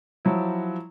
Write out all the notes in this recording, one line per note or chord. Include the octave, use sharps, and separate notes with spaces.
F3 F#3 E4